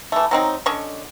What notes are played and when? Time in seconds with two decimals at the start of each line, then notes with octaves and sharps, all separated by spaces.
0.12 E3 A3
0.31 F#3 C4 D#4
0.66 D3 C#4 D#5 C#6